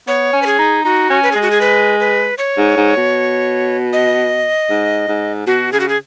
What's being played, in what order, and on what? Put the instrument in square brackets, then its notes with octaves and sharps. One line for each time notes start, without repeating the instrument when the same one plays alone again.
[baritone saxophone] B3 [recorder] C#5
[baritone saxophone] C#4
[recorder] B4
G#4
[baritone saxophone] D#4
[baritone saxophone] D#4 [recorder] F#4
[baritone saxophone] C#4
[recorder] B4
[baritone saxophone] G#3 [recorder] G#4
[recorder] F#4
G#4
B4
B4
C#5
[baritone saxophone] G#2
G#2
B2
[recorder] D#5
[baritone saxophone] G#2
G#2
[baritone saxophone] B2 [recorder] F#4
[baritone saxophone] C#3 [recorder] G#4
[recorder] F#4
G#4